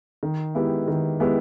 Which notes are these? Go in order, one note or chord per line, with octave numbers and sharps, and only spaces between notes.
D#3
G#3 B3 E4 G4
D#3
G#3 B3 E4 G4